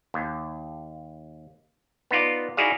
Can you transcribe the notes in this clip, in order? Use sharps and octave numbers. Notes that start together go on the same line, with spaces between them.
D#2
B3 D#4 F4 D5
D#4 E4 F#4 G#4 D5 F5